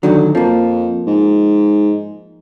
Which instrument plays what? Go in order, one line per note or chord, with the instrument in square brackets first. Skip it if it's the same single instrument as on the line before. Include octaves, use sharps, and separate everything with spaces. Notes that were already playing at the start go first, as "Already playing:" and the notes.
[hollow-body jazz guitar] D2 D#3 F#3 [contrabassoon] D3
[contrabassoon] F2 [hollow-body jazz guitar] F3 A#3
[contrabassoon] G#2